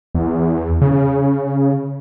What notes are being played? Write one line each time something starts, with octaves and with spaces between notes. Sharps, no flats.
E2
C#3
C#3